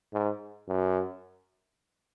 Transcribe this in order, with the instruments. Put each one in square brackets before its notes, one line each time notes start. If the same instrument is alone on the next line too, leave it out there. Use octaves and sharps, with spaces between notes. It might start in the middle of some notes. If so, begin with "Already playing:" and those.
[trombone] G#2
F#2